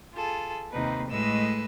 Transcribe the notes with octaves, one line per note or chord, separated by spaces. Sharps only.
F4 G#4 A4
D#2 C3 D#4 B4
A2 G#3 A3 B4 D#5 E6